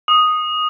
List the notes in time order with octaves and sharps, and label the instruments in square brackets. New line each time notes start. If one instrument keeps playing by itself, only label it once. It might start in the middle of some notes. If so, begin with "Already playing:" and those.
[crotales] D#6